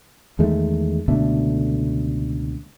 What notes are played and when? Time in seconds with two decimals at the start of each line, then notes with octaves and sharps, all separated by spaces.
0.39 E2 D#3 G#3 A3
1.08 C#2 B2 D3 A3